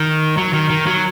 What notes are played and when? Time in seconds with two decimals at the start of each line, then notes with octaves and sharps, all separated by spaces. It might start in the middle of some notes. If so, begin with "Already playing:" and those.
Already playing: D#3
0.37 F#3
0.53 D#3
0.70 D#3
0.87 F#3